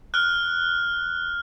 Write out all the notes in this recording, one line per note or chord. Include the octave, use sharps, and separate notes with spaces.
F6 F#6